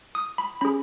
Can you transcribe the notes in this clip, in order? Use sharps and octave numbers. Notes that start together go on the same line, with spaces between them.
D#6
B5
C#4 G#4 B5